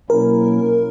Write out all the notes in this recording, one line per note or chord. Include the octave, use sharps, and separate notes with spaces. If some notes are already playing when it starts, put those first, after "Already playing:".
B2 F#3 A#3 C#4 E4 A#4